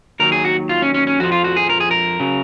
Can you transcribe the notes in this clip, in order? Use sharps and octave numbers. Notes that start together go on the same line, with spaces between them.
D#2 D#3 F#3 A#4
G#4
F#4
F4
C#4
C#4
C#4
F2 F3 F#4
F4
F#4
G#4
A#4
G#4
A#4
C#3 F#3